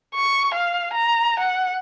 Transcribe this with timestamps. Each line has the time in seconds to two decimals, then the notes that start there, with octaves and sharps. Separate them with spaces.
0.15 C#6
0.54 F5
0.94 A#5
1.40 F#5